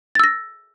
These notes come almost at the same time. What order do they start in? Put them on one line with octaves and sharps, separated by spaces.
A6 E6 A#6